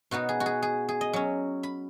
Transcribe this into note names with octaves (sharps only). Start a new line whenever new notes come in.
B2 B3 D#4 F#4
G#4
F#4
G#4
G#4
G#4
D#5
F#3 C#4
B5